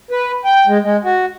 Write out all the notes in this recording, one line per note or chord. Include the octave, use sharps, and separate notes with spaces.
B4
G5
G#3
G#3
F#4